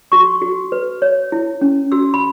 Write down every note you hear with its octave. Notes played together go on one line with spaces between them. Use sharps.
F#4 C#6
F#4
B4
C#5
E4
C#4
F#4 E6
B5